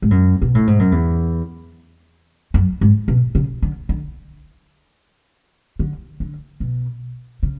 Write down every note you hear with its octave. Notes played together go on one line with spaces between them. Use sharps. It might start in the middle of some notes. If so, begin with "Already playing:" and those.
G#2
F#2
B2
A2
G#2
F#2
E2
F#2
G#2
B2
C#3
D3
D3
D3
D3
B2
C#3